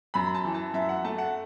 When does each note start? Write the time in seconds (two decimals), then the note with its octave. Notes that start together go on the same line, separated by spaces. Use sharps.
0.14 F#2 B5
0.34 A5
0.45 E3
0.54 A5
0.74 F#2 E5
0.89 F#5
1.04 A3 A5
1.18 F#5